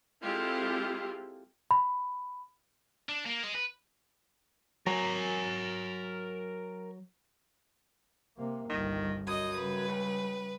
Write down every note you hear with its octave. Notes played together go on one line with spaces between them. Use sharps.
G#3 C4 E4 F4 G4 A4
B5
D4
A#3
G#4 D#5
B4
F#3 F#4 A#4 G#5 A#5
C3 A#3
G1 C2 D#3
F#2 D#5 D#6
C#3 G3 B4
C#2